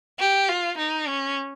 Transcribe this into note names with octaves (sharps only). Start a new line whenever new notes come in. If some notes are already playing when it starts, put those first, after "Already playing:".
G4
F4
D#4
C#4